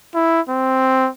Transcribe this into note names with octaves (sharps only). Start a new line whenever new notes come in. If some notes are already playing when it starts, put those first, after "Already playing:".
E4
C4